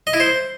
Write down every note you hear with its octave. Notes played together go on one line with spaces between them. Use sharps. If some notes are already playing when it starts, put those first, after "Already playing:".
D#5
E4
C5